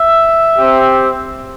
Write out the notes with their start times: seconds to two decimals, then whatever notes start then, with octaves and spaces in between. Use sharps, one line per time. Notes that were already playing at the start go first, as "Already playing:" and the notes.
Already playing: E5
0.58 C4 G4